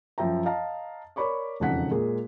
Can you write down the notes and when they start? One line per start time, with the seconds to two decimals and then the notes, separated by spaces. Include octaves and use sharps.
0.18 F#2 F3 E5 G5 A#5
0.46 D#5 F5 A5 A#5
1.16 A#4 C#5 D5 B5 C#6 D6
1.60 E1 F2 C#3 D#4 F#5 B6
1.91 A#2 G#3 G#4 A#4